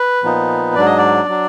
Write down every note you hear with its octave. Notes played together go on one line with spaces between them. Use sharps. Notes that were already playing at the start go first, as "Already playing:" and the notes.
Already playing: B4
A#2 F3 B3 D#4
G#2 F#3 D4 D5
D#5
D5
F#3 D4